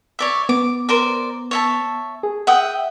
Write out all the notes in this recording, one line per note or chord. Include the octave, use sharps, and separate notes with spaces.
C#5 D5 E5
B3 D6
A#4 C5 D5
C#5 E5 A5
G#4
E5 F#5 G5 D#6